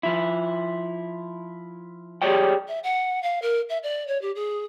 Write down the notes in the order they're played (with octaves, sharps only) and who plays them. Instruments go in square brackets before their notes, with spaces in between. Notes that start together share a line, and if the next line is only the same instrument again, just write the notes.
[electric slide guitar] F3 E4
G4 G#4 C#5 D5 G5
[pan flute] E5
F#5
F5
A#4
E5
D5
C#5
G4
G#4